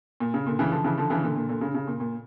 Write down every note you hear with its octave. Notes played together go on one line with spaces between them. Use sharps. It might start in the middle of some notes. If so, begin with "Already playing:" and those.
A#2
C#3
A#2 D3
C#3 E3
D3 F3
C#3 E3
D3 F3
C#3 E3
A#2 D3
A#2 D3
A#2 D3
C#3
C#3
A#2
A#2